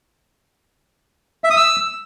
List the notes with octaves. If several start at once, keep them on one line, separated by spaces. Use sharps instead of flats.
E5
D#6
E6